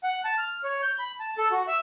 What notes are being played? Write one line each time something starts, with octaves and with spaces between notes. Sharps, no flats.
F#5
A5
F6
C#5
G6
B5
A5
A4
F#4
E5